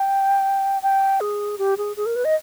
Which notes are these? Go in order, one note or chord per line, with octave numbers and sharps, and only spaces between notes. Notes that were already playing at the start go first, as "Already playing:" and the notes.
Already playing: G5
G5
G#4
G4
G#4
G#4
A#4
B4
D#5